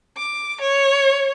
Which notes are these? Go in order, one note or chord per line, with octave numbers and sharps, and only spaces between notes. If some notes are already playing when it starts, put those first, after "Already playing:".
D6
C#5